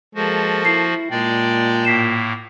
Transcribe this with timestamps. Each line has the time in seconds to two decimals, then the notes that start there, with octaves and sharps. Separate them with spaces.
0.15 F3 G#3 A#3 F#4 A4
0.65 E4 C7
1.11 A#2 G#3 D5 G5 A5
1.85 A2 A#3 B6 C7 E7